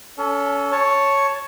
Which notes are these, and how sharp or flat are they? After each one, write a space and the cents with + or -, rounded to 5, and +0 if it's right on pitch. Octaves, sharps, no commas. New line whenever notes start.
C#4 +30 A4 +0
C#5 +0 A5 +0